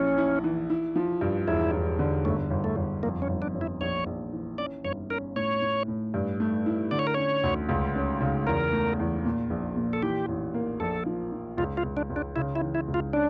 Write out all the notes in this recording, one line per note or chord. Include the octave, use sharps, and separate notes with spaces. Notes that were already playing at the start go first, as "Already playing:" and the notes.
Already playing: A#1 C#4 E4
E4
E3
E4
F3
G2
E1 E4
E1
D3
G1 A3
G1
A3
G1
F2 A#3
C#4
G1
D4
G1
E4
A#1 C#5
A#1
E3
C#4 D5
G1 C#5
C#4 A#4
A2 C#5
A2
A2
G2
A3
E4
D3 D5
C#5
A#4
C#4 C#5
D2
C#2
C#4
C#3
E2 A#4
A3
E2
A#2
A#1
A#2
A4
E3 G4
A1
A#3
A#1 A4
F3
F3
C#2 F4
F4
C#2
D4
C#2
D4
C#3 E4
E4
E3
E4
C#2
F4
C#4 D4